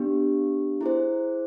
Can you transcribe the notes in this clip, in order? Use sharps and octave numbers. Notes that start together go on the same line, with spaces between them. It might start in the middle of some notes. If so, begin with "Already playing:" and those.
Already playing: B3 D4 G4
E4 G#4 C5